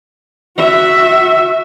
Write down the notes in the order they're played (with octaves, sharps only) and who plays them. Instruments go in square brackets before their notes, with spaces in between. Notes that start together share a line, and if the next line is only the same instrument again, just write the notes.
[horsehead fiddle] F#4 E5